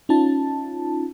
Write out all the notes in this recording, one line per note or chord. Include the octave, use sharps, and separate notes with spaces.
C#4 D#4 F4 A5